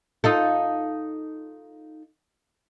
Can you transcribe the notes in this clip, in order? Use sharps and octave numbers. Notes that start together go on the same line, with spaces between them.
D#4 F4 A4